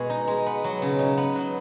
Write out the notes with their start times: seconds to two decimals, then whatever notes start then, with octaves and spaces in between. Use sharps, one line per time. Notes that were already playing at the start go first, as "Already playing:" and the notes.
Already playing: B2 G#3 G#4
0.10 D#4
0.27 G#3
0.46 B3
0.64 F#3
0.82 C#3
0.99 D#4
1.17 B3
1.35 F#3